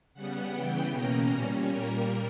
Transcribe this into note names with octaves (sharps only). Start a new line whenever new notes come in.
C#3 G3 B3 F#5
C#3 E3 B3 G5
B2 A#3 C#4 A#5
A#2 G3 C#4
A#2 G3 A#3 A#4